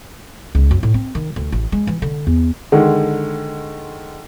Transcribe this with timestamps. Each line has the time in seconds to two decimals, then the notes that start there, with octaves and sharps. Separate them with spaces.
0.55 C#2
0.71 F#2
0.83 A2
0.94 C4
1.15 D#3
1.36 D2
1.52 A1
1.72 G#3
1.87 E3
2.02 D3
2.27 E2
2.72 D3 D#3 G#3